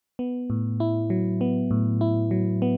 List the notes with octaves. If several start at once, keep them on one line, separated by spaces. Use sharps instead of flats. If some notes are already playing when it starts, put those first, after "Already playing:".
B3
A2
E4
F#3
B3
A2
E4
F#3
B3